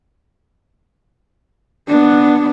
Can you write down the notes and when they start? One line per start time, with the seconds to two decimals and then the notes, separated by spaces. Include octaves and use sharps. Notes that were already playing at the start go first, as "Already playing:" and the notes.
1.89 B3 D4